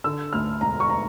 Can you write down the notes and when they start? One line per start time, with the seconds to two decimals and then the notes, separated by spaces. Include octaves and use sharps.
0.04 D3 E6
0.33 D2 F6
0.61 E1 A#5
0.80 C#6
0.90 A#5